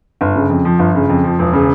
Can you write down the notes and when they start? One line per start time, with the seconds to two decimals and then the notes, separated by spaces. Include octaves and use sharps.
0.21 G1
0.36 C#3
0.50 F2
0.65 F3
0.79 G1
0.95 C#3
1.09 F2
1.24 F3
1.39 E1
1.53 C#3